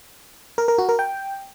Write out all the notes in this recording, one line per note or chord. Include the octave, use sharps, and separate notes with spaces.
A#4
A#4
F#4
A#4
G5